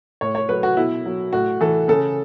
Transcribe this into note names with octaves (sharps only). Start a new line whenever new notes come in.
A2 C#5
C#5
F#3 B4
F#4
B2 E4
F#3
A2 F#4
E3 A4
C#3 A4